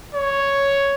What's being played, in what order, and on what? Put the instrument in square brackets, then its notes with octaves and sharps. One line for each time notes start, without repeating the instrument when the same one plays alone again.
[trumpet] C#5